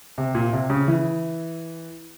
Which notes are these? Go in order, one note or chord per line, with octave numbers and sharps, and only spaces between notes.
C3
A#2
C3
C#3
E3